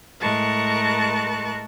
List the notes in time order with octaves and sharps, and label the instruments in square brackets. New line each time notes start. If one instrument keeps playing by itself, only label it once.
[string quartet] A2 G#3 A#4 A5 C#6 F#6